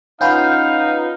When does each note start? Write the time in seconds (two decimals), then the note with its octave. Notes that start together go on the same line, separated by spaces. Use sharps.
0.21 C#4 D#4 F4 B4 F5 F#5 G6